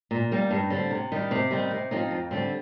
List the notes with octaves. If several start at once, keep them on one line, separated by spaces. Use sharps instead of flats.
A#2
G3 A#3
G2
D3 G3 C4
C3
D#3 G3
C3
D#3 G3 C4
C3
F3 C4 D#4
F2
D3 G3 C4